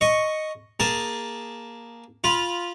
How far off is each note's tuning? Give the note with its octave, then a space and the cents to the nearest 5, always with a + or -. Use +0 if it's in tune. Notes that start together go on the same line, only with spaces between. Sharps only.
D#5 +0 C#6 +0
A#3 +5 G#4 -10 A5 +0
F4 +0 B5 -20